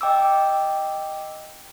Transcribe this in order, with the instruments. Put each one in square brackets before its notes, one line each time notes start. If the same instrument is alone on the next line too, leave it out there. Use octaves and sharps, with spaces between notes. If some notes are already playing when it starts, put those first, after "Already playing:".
[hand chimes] D#5 G5 D6 E6